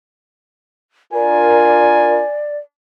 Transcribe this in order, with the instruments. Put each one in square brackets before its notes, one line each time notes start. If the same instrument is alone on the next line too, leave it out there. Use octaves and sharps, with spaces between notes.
[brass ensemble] D4 F4 A#4 [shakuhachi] D5 [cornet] G#5